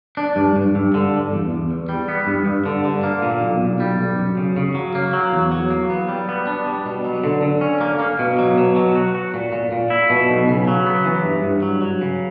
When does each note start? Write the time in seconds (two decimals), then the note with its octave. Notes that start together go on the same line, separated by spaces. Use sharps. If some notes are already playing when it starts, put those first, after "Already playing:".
0.17 D4
0.36 G2
0.56 G2
0.75 G2
0.94 D3
1.13 G2
1.32 E2
1.51 E2
1.71 E2
1.89 G3
2.08 B3
2.27 G2
2.46 G2
2.66 D3
2.85 D3
3.03 A#3
3.22 A#2
3.41 B1
3.61 B1
3.80 G3
3.99 B1
4.19 F#2
4.37 C#3
4.57 C#3
4.75 F#3
4.95 A#3
5.13 F#3
5.32 E2
5.52 F#3
5.70 A#3
5.90 B3
6.09 G3
6.29 B3
6.47 D4
6.66 G3
6.86 B2
7.05 F#3
7.24 D3
7.42 D3
7.61 C#4
7.81 A#3
7.99 A#3
8.19 B2
8.39 F#3
8.58 B2
8.76 F#3
8.95 F#4
9.15 F#4
9.34 A#2
9.53 A#2
9.72 A#2
9.90 E4
10.10 B2
10.29 B1
10.48 C#3
10.67 F#3
10.86 B3
11.05 E3
11.24 G2
11.43 G2
11.62 F#3
11.82 F#3
12.01 C#3